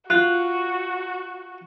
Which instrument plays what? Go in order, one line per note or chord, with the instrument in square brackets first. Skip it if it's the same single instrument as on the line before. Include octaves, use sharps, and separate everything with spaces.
[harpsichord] F4 [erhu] F#4 [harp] F#6